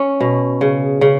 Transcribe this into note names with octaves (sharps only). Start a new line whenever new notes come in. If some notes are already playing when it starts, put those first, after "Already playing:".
Already playing: C#4
B2
C#3
C#3